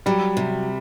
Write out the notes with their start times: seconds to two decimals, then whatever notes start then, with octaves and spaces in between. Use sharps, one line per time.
0.06 F#3 G3
0.37 C3